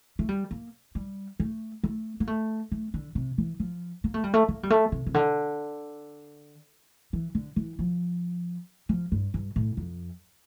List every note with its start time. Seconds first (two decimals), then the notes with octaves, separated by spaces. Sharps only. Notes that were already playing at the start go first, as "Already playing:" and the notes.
0.19 A3
0.29 G3
0.51 A#3
0.95 G3
1.40 A3
1.83 A3
2.20 A#3
2.27 A3
2.72 A3
2.94 D3
3.15 C3
3.38 E3
3.60 F3
4.04 A#3
4.14 A3
4.24 G3
4.34 A3
4.48 A#3
4.63 G3
4.70 A3
4.92 C3
5.07 C3
5.14 D3
7.13 E3
7.35 D3
7.56 E3
7.79 F3
8.89 F3
9.12 G2
9.34 G2
9.56 A2
9.77 F2